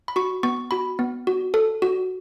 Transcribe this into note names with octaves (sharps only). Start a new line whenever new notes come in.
B5
F#4 C#6
B3 C#6
F#4 B5
B3
F#4
A4
F#4